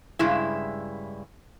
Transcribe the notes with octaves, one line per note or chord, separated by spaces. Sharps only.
G2 C#3 G#3 E4